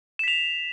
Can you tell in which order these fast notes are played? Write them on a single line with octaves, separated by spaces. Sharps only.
E7 B6 F7